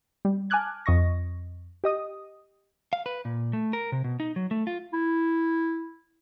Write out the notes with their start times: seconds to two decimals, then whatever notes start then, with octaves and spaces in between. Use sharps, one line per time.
0.25 G3
0.50 G#5 A5 D6 F6 F#6 G#6
0.86 F2 D#5 C#6 A#6
1.84 G4 D#5 D#6
2.93 F5
3.06 B4
3.25 A#2
3.53 A3
3.73 A#4
3.92 C3
4.04 B2
4.20 D#4
4.36 F#3
4.51 A3
4.67 F4
4.93 E4